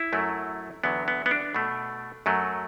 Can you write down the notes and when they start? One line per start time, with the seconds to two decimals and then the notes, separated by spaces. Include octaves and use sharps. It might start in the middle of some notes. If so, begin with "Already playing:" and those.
Already playing: E4
0.13 F#2 F#3 A3
0.84 E2 D3 F#3 B3
1.08 B3
1.26 B3
1.31 D4
1.55 B2 A3
2.26 F#2 F#3 A3